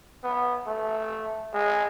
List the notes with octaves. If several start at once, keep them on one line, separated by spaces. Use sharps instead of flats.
B3
A3
G#3